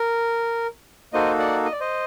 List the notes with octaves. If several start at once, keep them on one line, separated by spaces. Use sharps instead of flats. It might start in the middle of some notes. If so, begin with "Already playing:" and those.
Already playing: A#4
A#3 D#4 F#4 A4 C5 D#5
D5 F#5
D#5
D5
C5 D#5